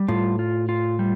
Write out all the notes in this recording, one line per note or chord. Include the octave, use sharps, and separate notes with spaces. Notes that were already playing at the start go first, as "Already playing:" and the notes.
Already playing: G3
A2 F4
F4
F4
G3